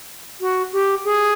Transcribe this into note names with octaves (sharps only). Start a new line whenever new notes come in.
F#4
G4
G#4